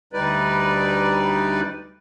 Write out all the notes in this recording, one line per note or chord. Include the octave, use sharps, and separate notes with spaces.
D2 G3 D#4 B4 D5